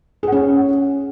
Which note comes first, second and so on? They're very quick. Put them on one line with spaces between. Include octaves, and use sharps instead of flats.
G#4 F#5 C#4